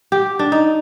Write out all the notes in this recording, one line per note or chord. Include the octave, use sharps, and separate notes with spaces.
G4
D4
D#4